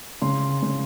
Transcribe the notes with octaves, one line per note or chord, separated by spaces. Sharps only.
C#3 C6
C#3